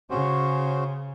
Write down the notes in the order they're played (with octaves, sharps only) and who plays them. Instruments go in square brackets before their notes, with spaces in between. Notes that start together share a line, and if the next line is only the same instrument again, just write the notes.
[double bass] C#3 [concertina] C#4 F#4 C5